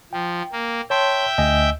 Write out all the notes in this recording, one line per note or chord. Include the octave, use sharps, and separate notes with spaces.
F3 G5
A#3
C#5 E5 G5 A5 C6
D2 D#5 G#5